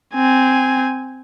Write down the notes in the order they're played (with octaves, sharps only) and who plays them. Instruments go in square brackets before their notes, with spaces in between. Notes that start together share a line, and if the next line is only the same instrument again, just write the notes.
[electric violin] C4 G#5